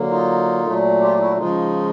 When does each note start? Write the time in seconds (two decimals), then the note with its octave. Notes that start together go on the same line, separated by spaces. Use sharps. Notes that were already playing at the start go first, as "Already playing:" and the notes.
Already playing: D3 F#3 A#3
0.10 D#4 F4
0.65 A#2 F#3 A3
1.01 F4 G4
1.20 E4 F#4
1.37 C#3 F3 G#3 D#4 F4